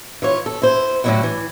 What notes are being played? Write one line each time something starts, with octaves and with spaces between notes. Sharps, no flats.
E3 F4 C#5
A4
E4 C5
A2 D3 D#3 F#3 E4 F#4
E3